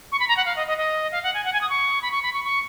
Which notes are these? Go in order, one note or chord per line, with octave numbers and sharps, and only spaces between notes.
C#6
B5
A#5
F#5
F5
D#5
D#5
D#5
F5
F#5
G#5
F#5
G#5
D#6
C#6
B5
C#6
B5
C#6
C#6